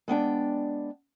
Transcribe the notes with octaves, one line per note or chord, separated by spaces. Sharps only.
G#3 B3 D4 G5